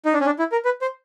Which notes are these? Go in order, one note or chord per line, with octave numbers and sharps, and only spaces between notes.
D#4
D4
C#4
D4
E4
A#4
B4
C5